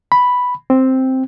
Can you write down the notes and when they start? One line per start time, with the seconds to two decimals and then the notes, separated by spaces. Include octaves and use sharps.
0.12 B5
0.70 C4